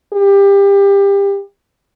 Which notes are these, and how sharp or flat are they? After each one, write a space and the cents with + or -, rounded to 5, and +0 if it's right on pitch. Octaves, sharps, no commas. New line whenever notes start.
G4 +25